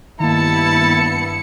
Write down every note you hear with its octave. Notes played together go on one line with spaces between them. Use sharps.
G2 D#3 A#3 B3 E4 A5 C#7